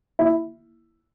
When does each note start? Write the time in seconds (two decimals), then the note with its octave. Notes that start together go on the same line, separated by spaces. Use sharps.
0.19 E4